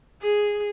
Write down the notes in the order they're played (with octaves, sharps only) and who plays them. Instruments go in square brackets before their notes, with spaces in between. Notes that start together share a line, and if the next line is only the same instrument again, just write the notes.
[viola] G#4